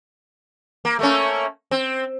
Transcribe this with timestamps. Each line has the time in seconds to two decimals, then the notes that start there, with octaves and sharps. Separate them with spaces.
0.85 A#3
0.99 A3 A#3 C#4
1.71 C4